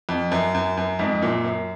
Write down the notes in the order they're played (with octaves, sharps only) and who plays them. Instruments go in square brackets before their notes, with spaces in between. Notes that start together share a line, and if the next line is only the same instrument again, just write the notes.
[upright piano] F2
F#2
F#2
F#2
F2 G#2
F#2 A#2
F#2